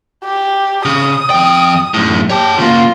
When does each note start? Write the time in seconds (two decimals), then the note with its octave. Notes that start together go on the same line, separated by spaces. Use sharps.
0.24 G4
0.85 C#3 D#6
1.30 F2 G5
1.94 F#2 A2
2.30 G4 C#5 A5
2.58 C#3 A#3 F4